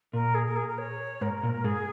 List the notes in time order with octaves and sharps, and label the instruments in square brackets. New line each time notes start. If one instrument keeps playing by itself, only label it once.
[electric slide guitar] A#2 [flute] A#4
[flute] G#4
A#4
G#4
A#4
C#5
[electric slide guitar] G#2 [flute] A#4
[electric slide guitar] A#2
[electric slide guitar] G#2 [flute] G#4